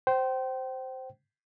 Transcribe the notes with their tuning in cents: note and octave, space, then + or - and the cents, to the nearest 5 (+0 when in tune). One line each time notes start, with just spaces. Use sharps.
C5 +0 G5 -30